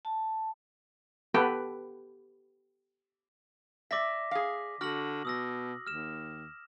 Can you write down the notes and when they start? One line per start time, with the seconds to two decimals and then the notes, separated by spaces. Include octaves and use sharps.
0.05 A5
1.34 B3 G4 A4 B4
3.91 D5 E5 D6 A#6 B6
4.31 G#4 F5
4.81 D3 F#4 F6 A#6 F#7
5.25 B2 D#6 E6 A#6
5.87 D#2 F6 E7